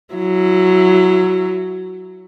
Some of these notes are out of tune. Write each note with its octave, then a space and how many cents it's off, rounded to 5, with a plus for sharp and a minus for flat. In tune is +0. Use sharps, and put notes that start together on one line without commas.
F#3 +0 E4 +20